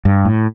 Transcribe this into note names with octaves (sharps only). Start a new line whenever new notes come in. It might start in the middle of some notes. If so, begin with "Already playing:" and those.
G2
A2